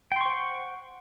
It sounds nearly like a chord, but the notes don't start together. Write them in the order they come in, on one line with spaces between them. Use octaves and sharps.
G5 C6 C#6 C5 F#5